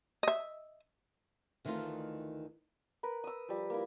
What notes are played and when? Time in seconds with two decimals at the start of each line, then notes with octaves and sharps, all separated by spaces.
0.23 D#5 E5
1.65 D2 D#3 E3 A3 D#4 F4
3.03 A#4 B4 B5
3.24 D#6 E6
3.48 F3 G3
3.70 A#3 E4